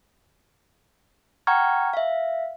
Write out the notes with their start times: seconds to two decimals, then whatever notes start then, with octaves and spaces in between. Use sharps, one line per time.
1.47 F#5 G5 A#5 C#6 F6 G#6
1.93 E5 F5